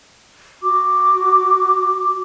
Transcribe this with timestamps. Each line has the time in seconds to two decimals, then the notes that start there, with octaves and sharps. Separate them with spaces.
0.63 F#4 D6